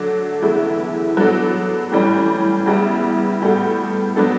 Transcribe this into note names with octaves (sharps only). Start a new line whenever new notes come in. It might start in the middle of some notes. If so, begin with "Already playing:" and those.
Already playing: D3 F#3 A3 D4
E2 C#3 E3 A3 E4
F#3 B3 D4 A4
A2 E3 G3 C#4
E2 C#3 G3 B3 E4
A2 G3 B3 F#4 A4
F#3 B3 D4 A4